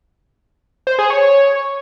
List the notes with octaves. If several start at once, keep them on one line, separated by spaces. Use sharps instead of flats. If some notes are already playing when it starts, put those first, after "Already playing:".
C5
G#4
C#5